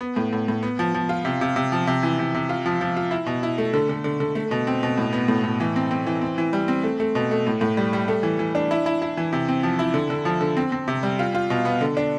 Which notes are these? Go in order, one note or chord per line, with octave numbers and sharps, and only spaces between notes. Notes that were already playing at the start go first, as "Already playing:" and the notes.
B3
A2
A2
A2
B3
F3
F3
F4
C3
C3
C3
F3
C3
E3
C3
C3
F4
F3
F3
F4
E4
B2
E4
A3
D3
D3
D3
D3
A3
B2
C4
B2
A2
B3
A2
A2
E3
C4
C4
E3
C4
E3
G3
C4
A3
A3
B2
A3
A2
A2
G3
G3
A3
E3
E3
D4
E4
E4
E4
E3
C3
C4
F3
E4
D3
D3
F3
D3
C4
C4
C3
G3
F4
F4
B2
B3
D3
D4